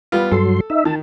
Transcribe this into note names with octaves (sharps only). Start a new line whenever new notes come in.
G3 B3 F4
G2 F#3 A4 C6
D#4 E5
D#3 A5